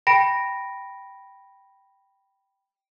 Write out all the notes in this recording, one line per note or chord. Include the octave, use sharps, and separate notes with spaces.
G5 B5 A#6 D7